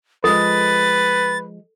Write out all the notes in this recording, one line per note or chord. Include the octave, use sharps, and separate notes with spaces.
F3 G#3 A4 B4 A6